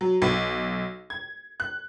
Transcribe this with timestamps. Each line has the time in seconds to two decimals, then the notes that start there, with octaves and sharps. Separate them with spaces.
0.01 F#3
0.22 B1
1.10 G#6
1.60 F#6